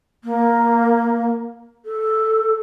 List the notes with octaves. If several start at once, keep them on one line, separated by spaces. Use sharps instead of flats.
A#3
A4